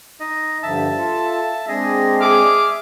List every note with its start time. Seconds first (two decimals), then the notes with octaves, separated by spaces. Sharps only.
0.20 D#4 D#5
0.63 G2 D3 F3 E5 A5
0.96 F4 A4
1.68 G#3 C4 D4 G#4 D#5
2.20 G#4 E5 D6 F6